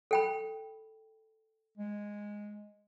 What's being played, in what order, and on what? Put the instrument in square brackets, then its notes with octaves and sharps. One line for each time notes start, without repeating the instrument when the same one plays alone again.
[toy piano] A4 G5 B5
[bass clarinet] G#3